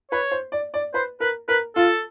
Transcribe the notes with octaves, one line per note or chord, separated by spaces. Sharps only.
B4 C#5
C5
D5
D5
B4 C5
A#4 B4
A#4 B4
F4 A4